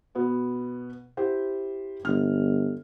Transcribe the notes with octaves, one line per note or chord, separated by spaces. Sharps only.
B2 B3
E4 G4 C5
G1 F6